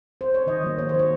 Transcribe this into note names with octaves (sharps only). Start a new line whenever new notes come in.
C5
C#5
D#3 D#5
F#3 A#3
D#3 C#5
C5
F#3 A#3 C#5